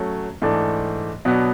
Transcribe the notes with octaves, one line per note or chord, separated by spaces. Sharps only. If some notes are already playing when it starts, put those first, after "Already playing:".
Already playing: F#3 A3 C#4
G#2 E3 A3 D4
B2 F#3 B3 D4